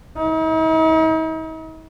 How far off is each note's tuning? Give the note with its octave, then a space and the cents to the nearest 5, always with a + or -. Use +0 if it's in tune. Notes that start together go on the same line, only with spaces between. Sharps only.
D#4 +45